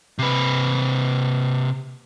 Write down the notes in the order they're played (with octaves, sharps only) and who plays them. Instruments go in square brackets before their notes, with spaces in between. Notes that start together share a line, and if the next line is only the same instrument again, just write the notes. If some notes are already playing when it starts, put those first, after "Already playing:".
[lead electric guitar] C3 B4